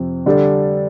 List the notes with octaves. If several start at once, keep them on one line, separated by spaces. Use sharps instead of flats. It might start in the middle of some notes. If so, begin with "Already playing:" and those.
Already playing: F2 C3 F3 C4
D3 G3 D4 A4